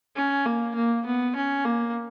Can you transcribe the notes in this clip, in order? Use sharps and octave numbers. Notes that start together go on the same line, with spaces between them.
C#4
A#3
A#3
B3
C#4
A#3